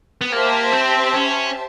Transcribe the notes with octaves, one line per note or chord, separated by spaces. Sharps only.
B3
A#3 G4 C5 E5 A5
C4
C#4